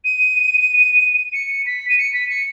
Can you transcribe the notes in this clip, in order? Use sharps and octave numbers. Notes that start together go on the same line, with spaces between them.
D#7
C#7
B6
D#7
C#7
B6
C#7